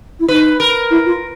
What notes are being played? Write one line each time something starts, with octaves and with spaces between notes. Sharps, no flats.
E4
D#4 B4
A#4
E4
F4